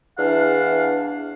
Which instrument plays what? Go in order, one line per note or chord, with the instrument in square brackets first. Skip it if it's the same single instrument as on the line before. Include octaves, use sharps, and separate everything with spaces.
[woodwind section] E2 E3 D4 F5 F#5